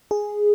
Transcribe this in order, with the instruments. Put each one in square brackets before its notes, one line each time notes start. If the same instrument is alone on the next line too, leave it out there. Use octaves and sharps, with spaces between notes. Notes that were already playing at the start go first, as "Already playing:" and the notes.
[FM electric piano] G#4